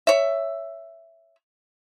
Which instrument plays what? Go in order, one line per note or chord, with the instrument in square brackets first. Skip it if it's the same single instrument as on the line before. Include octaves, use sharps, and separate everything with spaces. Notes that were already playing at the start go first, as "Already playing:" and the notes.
[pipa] C#5 E5